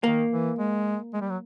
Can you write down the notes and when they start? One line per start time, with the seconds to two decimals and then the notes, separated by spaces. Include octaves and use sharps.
0.04 D#3 A#3
0.32 E3
0.59 G#3
1.14 G#3
1.21 G3
1.29 F#3